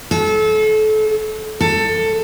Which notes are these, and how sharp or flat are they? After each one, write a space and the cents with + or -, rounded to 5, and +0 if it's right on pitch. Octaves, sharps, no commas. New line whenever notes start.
A4 -30
A4 +15